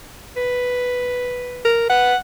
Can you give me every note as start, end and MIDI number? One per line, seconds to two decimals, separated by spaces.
0.37 1.73 71
1.65 1.85 70
1.90 2.14 71
1.90 2.17 78